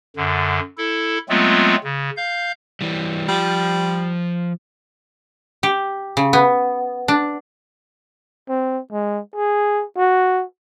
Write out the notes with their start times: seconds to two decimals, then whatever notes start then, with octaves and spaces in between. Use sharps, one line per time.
0.16 F#2 D3
0.78 E4 A4
1.29 F#3 G#3 A3 B3 C4 F4
1.84 C#3
2.17 F5 G6
2.81 E3 G3
3.29 F3 G3
5.63 G4
6.17 C#3
6.33 B3
7.08 D4
8.49 C4
8.92 G#3
9.36 G#4
9.97 F#4